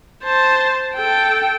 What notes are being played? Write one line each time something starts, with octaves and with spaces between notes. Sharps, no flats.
C5 A5
A4 G5